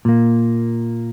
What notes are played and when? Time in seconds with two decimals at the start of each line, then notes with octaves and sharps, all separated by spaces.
0.05 A#2 A#3